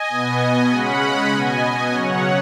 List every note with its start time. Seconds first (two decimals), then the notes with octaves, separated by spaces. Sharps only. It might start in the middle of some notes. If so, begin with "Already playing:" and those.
Already playing: D#5 G#5
0.09 B2 B3
0.70 C#3 G#3 C#4 F#5 B5
1.31 B2 B3 D#5 G#5
1.91 C#3 F#3 C#4 C#5 F#5